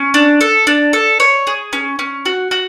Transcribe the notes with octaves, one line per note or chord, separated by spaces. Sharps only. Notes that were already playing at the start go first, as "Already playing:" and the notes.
Already playing: C#4
D4
A4
D4
A4
C#5
G#4
C#4
C#4
F#4
F#4